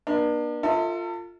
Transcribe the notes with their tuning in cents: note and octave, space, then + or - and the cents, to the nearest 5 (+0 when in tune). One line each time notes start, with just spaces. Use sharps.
B3 -45 D4 +35
F4 +0 A4 +40 E5 -35